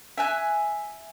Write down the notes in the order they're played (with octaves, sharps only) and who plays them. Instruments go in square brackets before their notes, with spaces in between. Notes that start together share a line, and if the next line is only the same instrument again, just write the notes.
[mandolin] E5 G#5 F#6